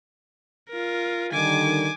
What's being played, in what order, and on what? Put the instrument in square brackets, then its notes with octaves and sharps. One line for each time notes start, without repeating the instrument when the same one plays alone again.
[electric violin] F4 A#4
[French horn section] D3 D#3 G3 [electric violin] G#5 D6